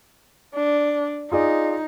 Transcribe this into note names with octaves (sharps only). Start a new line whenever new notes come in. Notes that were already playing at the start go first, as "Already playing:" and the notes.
D4
D#4 F4 G#4 D5